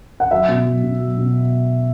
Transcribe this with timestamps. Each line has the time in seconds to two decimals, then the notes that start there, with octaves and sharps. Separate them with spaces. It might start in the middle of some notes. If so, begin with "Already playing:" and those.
0.20 F#5
0.31 F#3 E5
0.48 B2
0.65 F#3
0.83 B2
1.00 F#3
1.17 B2